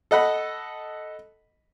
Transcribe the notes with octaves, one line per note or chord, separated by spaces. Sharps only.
A4 D#5 F#5 B5